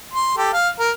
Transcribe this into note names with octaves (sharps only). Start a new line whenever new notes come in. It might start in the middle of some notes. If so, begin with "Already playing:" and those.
C6
G4 A4
F5
A#4